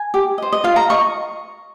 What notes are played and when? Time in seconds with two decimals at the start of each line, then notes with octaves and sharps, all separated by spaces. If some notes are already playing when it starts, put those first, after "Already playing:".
Already playing: G#5
0.14 G4
0.38 C5 D#5
0.53 D#5
0.64 F4 F5
0.76 A#5
0.89 A#4 D#5 C#6